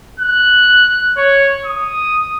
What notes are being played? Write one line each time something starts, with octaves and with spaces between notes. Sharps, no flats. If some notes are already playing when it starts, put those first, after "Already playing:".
F#6
C#5
D#6